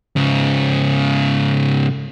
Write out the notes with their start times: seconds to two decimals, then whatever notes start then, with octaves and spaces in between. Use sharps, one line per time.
0.16 G#2 C#3